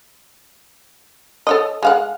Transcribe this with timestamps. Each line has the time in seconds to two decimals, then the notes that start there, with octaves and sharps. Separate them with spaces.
1.47 A4 C#5 D#5
1.83 G#3 F5 F#5